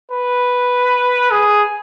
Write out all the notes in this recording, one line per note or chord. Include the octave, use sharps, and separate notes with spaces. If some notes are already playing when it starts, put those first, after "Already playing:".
B4
G#4